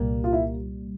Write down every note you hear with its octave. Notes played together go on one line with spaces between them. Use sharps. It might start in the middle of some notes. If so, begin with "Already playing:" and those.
Already playing: C2 A#2 G3 A#3
F4
E4